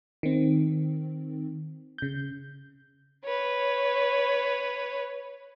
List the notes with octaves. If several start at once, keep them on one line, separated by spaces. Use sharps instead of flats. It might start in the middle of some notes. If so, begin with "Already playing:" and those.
D#3 C4
C#3 G6
B4 C#5